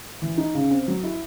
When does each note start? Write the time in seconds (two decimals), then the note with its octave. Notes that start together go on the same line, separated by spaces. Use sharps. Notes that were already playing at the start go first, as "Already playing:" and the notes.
0.22 E3
0.38 D#4
0.55 C#3
0.71 C4
0.88 F#3
1.03 E4